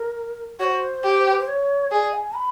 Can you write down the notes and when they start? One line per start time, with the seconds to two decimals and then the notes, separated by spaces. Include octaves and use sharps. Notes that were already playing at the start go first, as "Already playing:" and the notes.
Already playing: A#4
0.59 F#4 C#5
0.64 C5
1.04 G4
1.31 B4
1.39 C5
1.48 C#5
1.91 G#4 D5
2.14 G#5
2.36 B5